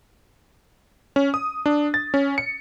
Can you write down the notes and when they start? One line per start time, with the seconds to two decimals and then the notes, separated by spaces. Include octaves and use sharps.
1.16 C#4
1.34 D#6
1.66 D4
1.94 A6
2.14 C#4
2.38 C#7